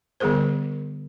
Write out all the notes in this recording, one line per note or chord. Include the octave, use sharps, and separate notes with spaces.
D3 G3 B3 G#4 A#4 C5